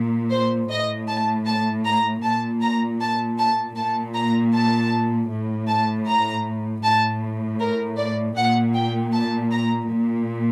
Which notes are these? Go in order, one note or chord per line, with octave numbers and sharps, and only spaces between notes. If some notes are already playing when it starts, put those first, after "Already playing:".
Already playing: A#2
C5
A2 D#5
A5
A5
A#5
A#2 A5
A#5
A5
A5
A#2 A5
A#5
A5
A2
A5
A#5
A2 A5
A#4
D5
A#2 F#5
G5
A5
A#5
A#2